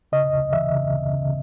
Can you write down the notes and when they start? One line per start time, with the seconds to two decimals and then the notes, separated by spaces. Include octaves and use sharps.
0.12 C#3 D#5
0.33 D2
0.53 E3 E5
0.72 C#3
0.91 D2
1.12 C#3